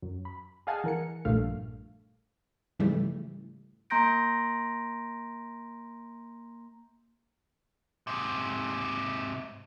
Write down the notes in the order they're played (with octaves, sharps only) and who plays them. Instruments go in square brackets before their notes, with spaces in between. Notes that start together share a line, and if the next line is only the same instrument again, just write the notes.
[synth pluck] F#2
B5
G#4 D#5 F5 F#5 G#5 A5
E3 A#4 C#7
A#1 G2 A#2 F3 A3 F5
G#2 C#3 E3 F3 G3 A3
[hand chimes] A#3 A#5 C6 G6 A#6 D7
[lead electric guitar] G#2 C3